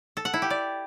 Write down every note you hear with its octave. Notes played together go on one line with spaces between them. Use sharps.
A4
F#5
E4
G4
D5